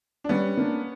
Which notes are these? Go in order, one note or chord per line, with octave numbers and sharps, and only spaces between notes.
D4
G3 B3 C#4
A#3 D4